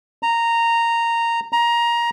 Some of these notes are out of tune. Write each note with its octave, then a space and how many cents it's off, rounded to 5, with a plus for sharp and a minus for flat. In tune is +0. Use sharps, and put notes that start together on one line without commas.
A#5 -10
A#5 +15